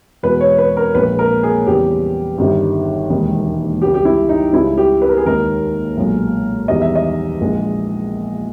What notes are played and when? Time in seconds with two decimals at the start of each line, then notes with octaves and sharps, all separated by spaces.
0.23 E2 B2 G#3 B4
0.40 C#5
0.58 B4
0.77 A#4
0.95 A#1 A#2 G#3 B4
1.19 A#4
1.43 G#4
1.67 E2 C#3 G3 G4
2.38 G1 G2 D#3 G3
3.10 E1 D#2 D#3 G#3
3.82 C#2 C#3 G3 G4
3.94 G4
4.05 E4
4.29 D#4
4.53 C#2 C#3 G3 E4
4.78 G4
5.02 B4
5.09 A#4
5.17 G#4
5.25 D#2 D#3 G#3 A#4
5.97 B1 A#2 G#3
6.68 E2 D#3 G3 D#5
6.82 E5
6.96 D#5
7.40 A#1 A#2 G#3